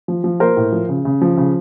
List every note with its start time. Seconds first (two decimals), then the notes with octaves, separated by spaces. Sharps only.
0.08 F3
0.24 F3
0.40 A#3 A#4 C5
0.57 A2
0.72 F3
0.89 C#3
1.05 C#3
1.21 F3
1.37 C#3